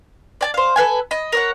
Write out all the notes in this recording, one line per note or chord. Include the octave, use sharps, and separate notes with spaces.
D5 G#5 A5
C5 F5
A4 B4 F5 G#5
D#5 B5
A#4 C#5 F#5